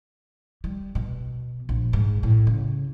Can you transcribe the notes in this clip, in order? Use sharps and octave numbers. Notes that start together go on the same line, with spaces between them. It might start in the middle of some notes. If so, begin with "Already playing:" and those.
G3
B2
A#1
G#2
A2
C#3